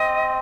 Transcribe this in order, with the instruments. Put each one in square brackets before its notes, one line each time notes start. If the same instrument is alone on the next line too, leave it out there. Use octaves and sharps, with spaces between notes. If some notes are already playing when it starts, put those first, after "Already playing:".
Already playing: [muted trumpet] C4 [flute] D#5